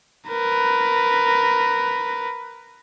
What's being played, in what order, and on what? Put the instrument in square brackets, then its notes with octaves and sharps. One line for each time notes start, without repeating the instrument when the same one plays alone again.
[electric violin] A#4 B4